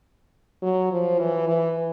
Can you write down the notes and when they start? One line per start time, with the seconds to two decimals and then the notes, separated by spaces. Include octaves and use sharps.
0.62 F#3
0.91 F3
1.19 E3
1.48 E3